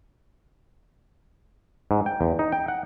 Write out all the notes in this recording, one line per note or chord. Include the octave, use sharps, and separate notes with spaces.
G#2
G5
E2
D#4
G5
F#5